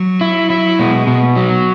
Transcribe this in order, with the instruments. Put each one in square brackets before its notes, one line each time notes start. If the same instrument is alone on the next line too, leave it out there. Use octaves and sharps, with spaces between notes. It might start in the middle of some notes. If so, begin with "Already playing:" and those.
Already playing: [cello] F#3
[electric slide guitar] E4
E4
[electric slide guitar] B2 [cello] G#3
[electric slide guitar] B2
[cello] B3
[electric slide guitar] F#3